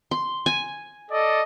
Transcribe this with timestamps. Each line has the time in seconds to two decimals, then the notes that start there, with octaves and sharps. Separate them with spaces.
0.11 C6
0.46 G#5
1.11 A4 D5 D#5